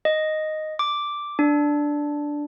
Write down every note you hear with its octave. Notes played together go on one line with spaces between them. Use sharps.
D#5
D6
D4